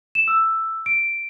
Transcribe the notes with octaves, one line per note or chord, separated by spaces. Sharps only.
E7
E6
D7